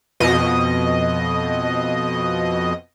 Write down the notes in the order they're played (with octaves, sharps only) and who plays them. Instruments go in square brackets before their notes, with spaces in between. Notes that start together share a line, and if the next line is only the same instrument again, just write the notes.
[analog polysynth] F2 B2 D#5